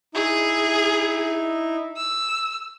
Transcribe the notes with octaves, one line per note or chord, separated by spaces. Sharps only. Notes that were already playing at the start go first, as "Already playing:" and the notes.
D#4 E4 G#4
E6